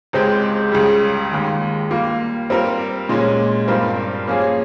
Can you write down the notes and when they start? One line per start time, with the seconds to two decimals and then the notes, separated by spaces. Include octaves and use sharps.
0.13 C#2 C#3 G#3 C4 G4
0.72 C#2 C#3 G3
1.31 D#2 D#3 G#3
1.90 G3 A#3 F4
2.50 G3 C4 F4 A#4
3.09 A#2 G#3 C#4
3.68 G2 G3 C4 F4 A#4
4.27 F3 A#3 C#4 F4 G#4